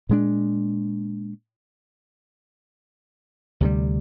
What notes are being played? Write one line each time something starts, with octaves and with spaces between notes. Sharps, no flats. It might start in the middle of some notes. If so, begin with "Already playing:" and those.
A#2 G#3 D4
D2 C3 G3